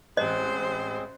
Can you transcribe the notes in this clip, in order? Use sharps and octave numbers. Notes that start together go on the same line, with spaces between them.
A1 G#3 C4 G#4 C5 D#5 F#6